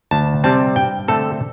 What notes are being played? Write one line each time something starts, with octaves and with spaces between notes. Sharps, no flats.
D2 A5
C3 G3 C4 A5
G2 G5
D3 A3 C4 A4